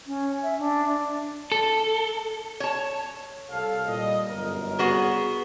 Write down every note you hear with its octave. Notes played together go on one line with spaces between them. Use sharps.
C#4
E5
D4
A4
C#5 A5
C2 A4 F5
A#2 G3 D#5
G1 F#2 A#4
B3 F#4 G#4